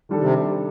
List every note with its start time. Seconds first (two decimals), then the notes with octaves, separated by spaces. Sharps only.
0.09 D#3 G3 D4 A4
0.22 C3